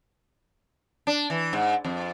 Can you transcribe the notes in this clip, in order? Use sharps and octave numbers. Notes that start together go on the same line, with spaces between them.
D4
E3
G#2
F2